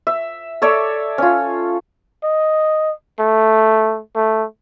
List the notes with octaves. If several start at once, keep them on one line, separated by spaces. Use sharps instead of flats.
E5
A4 C#5 D5 E5
C#4 F4
D#5
A3
A3